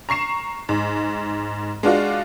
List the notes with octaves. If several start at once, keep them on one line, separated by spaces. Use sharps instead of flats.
A#5 C#6 C7 E7
G#2
G#3 D4 F4 F#4